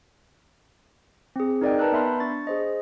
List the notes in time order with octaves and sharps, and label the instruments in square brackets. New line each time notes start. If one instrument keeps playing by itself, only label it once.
[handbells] C4 G#4
D#4 A#4 D5 D#5 G5
B4 A5 A#5 E6 F#6 G6
B3 E5 B5 C6 F6
D4 C#6 A6
G#4 C5 D#5